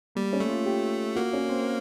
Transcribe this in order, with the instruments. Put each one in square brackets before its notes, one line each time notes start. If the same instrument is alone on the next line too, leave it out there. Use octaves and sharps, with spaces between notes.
[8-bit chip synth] G3 [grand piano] A#3
[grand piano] C#4
[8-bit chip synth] A3
[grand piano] F4
G4
[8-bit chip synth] A#3 [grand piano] F#4
[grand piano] C#4
C4